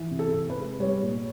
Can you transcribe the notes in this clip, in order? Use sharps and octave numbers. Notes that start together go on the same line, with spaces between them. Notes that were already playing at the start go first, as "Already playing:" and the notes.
Already playing: E3
C3
A4
C3
B4
G#3
G3 C#5
A#2